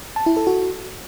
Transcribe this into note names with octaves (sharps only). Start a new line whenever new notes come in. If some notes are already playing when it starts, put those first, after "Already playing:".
A5
E4
A4
F#4